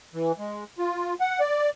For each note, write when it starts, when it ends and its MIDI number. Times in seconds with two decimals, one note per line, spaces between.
0.14 0.32 52
0.38 0.64 56
0.78 1.14 65
1.20 1.40 78
1.40 1.70 74